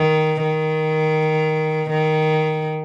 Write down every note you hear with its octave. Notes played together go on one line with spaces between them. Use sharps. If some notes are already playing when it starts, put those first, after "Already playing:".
Already playing: D#3
D#3
D#3